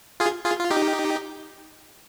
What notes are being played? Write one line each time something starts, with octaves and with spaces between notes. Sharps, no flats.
F4 G#4
F4 G#4
F4
D#4 G4